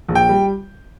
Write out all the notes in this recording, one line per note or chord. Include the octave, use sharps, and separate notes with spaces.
A#1
G5
G3